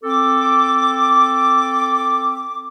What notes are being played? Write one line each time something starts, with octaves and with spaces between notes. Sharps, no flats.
C4 A4 D6